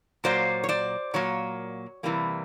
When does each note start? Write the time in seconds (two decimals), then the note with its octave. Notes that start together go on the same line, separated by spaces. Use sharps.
0.24 A#2 F#3 A#3 C5 D5
0.64 C#5
0.69 C5 D5
1.14 A#2 F#3 A#3 C#5
2.03 C3 E3 G3 A#3